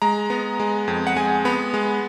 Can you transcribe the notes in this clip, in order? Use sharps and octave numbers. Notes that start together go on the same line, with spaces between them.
G#3 A#5
B3
G#3
F2
F#5
G#3 G#5
B3 B5
G#3